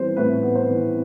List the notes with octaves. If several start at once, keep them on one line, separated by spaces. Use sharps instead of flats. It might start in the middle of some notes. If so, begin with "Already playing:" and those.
Already playing: E3 G3 B3 B4 C5
A2 B4
B3
C5
E3